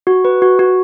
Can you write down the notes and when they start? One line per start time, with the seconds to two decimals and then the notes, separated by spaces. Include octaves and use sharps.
0.07 F#4
0.25 B4
0.42 F#4
0.59 F#4